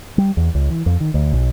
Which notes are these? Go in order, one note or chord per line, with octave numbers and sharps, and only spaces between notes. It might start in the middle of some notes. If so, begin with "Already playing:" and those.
G3
E2
C#2
E3
F2
D#3
D2
B1